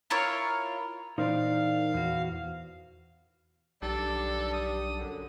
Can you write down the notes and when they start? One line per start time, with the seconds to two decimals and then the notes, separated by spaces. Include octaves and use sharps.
0.10 E4 F4 A#4 C#5
1.18 A#2 E3 D#4 A#4 C5 D5 F5
1.94 E2 F#4
3.82 B1 G2 D#3 G3 D4 A4
4.53 D#6
4.97 F#2 D3